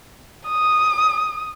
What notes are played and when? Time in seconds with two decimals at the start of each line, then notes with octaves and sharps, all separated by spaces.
0.47 D#6